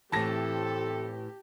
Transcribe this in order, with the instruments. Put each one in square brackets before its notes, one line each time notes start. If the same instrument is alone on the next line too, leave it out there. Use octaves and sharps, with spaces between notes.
[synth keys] A2 E3 [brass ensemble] C4 A4 [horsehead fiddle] G4 [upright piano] A5 A#6